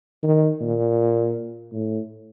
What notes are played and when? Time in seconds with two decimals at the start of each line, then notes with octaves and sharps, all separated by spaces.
0.23 D#3
0.61 A#2
1.73 A2